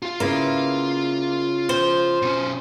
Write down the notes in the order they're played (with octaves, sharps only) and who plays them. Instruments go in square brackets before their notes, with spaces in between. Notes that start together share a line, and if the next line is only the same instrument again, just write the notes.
[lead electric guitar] F4 F5
[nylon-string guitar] C#3 B3 E4 [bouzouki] A#3
[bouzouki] C5
[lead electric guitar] B2 C#4